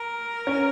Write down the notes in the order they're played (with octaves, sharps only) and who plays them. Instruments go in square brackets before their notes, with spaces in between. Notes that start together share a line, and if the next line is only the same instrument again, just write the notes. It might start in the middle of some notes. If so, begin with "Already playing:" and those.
Already playing: [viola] A#4
[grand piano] C#4